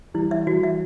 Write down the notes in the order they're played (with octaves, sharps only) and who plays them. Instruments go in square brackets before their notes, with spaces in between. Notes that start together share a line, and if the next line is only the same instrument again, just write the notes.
[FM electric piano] E3 G3 [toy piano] E4
[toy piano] E5
[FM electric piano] E3 G3 [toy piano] F#4
[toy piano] E5